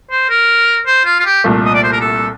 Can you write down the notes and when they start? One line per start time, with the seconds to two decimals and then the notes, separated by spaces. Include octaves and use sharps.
0.10 C5
0.29 A#4
0.86 C5
1.05 F4
1.20 F4
1.25 G4
1.44 C2 A#2 A3
1.65 D#5
1.74 D5
1.83 C5
1.92 A#4
2.01 A4